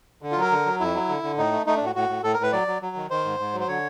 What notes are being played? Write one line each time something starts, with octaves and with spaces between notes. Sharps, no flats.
D3
F4
F#3 A#4
D3
F#3
F2 E4
F#3
D3
D3
A2 D#4
A3
A3 D#4
D4
A2 F#4
A2 F#4
A2
A2 A4
A#4
A2 B4
F#3 D5
F#3
F#3
D#3
D#3 C5
G#2
G#2
F#3
C5
D3 C#5